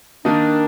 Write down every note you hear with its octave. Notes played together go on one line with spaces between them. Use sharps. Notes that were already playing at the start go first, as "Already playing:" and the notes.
D#3 A#3 D4 D#4